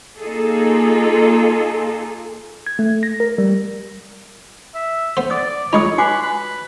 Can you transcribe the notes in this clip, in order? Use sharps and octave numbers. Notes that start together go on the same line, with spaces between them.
A#3 D#4 F4 G#4 A4
G#6
A3
A#6
A#4
G3
E5
B3 C5
D5 D#6
G#3 D#4 F4 C#5 D#6
F#4 B4 G#5 D6
B4